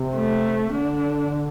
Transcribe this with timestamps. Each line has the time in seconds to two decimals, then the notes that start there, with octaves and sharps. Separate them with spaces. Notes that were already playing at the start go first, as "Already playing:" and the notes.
Already playing: C3
0.15 A3
0.73 D3 D4